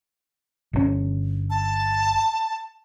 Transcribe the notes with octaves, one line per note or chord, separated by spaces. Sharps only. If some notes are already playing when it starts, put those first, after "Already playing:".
G1 C3 C#4
A5